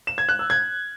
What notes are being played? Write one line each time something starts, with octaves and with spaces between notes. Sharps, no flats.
E7
G#6
F#6
E6
G#6